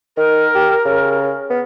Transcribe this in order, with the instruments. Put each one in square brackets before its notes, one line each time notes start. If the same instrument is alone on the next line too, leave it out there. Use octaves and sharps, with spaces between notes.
[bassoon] D#3 [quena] A#4
[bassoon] G4
C#3
B3